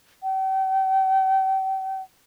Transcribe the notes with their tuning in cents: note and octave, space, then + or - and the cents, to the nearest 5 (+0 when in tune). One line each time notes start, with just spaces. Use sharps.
G5 -40